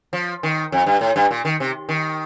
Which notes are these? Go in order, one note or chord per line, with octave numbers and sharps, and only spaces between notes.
F3
D#3
F2
G2
A2
G2
A#2
D#3
C3
D#3